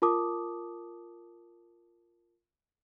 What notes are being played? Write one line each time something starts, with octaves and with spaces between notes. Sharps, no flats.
F4 A#4 A5 D6 D#6